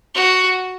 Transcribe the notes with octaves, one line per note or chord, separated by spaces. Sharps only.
F#4